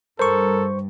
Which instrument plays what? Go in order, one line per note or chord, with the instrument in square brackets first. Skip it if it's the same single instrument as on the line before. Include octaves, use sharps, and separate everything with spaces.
[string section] G2 [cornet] A4 [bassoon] A#4 [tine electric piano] C5 C#6